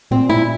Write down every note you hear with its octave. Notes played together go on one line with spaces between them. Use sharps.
A#2 C4
E4